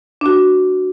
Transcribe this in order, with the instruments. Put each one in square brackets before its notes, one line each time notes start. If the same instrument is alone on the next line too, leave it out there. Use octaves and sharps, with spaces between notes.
[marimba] D4 F#4